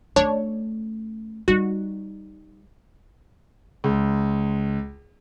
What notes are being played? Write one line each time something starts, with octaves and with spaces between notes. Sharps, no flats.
A3 C#4 D4 C#5
G3 D#4 F#4
C#2